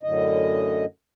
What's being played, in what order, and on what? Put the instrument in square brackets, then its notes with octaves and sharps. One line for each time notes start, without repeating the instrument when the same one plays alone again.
[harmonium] F#2 A2 D3 D#5